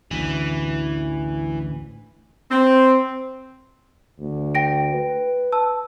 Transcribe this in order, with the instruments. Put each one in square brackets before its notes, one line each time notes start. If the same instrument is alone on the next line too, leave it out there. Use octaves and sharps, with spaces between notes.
[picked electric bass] A1 D2 [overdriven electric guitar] E3
[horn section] C4
[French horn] D2
[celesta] G5 A#6 D7
[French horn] B4
[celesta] A5 E6